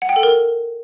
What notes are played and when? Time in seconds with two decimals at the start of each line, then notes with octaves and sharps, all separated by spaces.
0.02 F#5
0.09 G5
0.16 A4
0.23 A#4